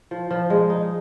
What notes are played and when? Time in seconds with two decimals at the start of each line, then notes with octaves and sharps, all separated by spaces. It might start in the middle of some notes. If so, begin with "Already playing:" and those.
0.11 F3
0.31 F3
0.50 G#3
0.70 D#4